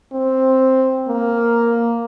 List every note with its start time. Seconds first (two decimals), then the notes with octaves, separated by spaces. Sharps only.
0.13 C4
1.07 A#3